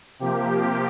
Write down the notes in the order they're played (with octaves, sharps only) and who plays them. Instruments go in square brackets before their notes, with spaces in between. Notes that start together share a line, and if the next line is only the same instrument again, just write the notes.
[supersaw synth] C3 F3 A#3 G4